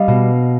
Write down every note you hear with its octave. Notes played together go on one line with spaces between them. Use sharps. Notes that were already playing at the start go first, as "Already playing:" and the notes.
Already playing: G3 D#5 F5
B2